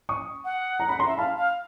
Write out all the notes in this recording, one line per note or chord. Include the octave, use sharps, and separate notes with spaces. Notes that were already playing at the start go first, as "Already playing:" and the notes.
C#6 D#6
F#5
A#5
B5
A#5 C6
E5
F5 A5 B5
F5